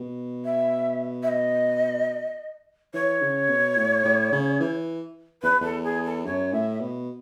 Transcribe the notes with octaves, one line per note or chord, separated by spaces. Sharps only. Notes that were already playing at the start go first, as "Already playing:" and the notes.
Already playing: B2
E5
E5
D#5
E3 C#5
C#3
B2
A2
A2
C#3
E3
E2 B4
E2 A4
G#4
A4
F#2 C#5
A2 E5
B2